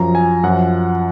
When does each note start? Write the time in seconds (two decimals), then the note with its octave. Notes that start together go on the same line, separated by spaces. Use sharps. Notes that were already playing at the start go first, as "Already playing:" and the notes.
Already playing: F#2 F3 A#5
0.15 G#5
0.43 F#2 F3 F#5